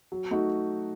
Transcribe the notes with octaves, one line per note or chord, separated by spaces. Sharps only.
F#3
A3 D#4 F#4